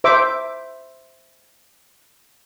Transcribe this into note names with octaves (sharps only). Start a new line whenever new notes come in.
C5 E5 D6